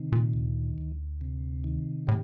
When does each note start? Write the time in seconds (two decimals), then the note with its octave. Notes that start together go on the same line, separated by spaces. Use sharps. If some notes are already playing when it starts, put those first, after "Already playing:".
Already playing: C3 D#3
0.12 A#2
0.34 D2
0.78 D2
1.21 C3
1.64 D#3
2.07 A2 G4